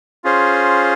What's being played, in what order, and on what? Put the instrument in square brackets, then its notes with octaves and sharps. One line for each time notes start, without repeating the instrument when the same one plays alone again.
[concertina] C#4 F4 G#4 C5